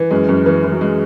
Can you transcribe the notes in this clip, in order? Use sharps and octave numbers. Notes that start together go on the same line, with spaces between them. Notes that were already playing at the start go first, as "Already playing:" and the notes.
Already playing: E3
F#2 G#3
F#2
E3
E3
F#3
G#3